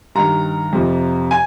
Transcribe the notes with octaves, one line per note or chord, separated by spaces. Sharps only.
G2 D#3 A#5
F2 C3 F3
G#5